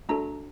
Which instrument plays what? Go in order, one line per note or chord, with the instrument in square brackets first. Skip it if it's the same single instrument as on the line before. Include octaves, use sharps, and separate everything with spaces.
[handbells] A3 D4 F#4 A4 A#5